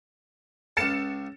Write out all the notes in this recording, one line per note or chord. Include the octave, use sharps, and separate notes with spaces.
C#2 F5 A6 C#7 E7